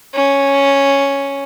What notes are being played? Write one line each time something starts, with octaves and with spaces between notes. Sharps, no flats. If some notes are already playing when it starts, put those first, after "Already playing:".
C#4